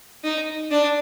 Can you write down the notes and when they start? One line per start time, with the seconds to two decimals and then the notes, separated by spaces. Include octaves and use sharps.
0.24 D#4
0.71 D4